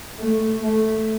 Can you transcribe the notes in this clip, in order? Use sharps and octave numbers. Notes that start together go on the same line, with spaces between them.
A3
A3